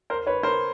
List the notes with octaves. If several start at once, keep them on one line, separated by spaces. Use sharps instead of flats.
A#4 C5
B4 C#5
A#4 C5